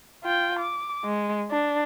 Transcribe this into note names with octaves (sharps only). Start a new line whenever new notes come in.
F4 G5
D6
G#3
D4